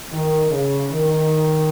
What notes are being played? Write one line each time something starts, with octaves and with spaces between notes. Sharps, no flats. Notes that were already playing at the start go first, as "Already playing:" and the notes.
D#3
C#3
D#3